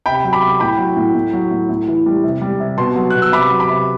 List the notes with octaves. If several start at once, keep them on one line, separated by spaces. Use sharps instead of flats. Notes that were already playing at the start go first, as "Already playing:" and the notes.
C3 G5 B5
F#3
B5 D6
C3
A2 G5 B5
F#3
A2
A2
F#3
A2
A2
E3
G3
C3
G3
C3
B2 A5 C6
F#3
B2 F#6
E6
C3 B5 D6
F#3
B5 D6
C3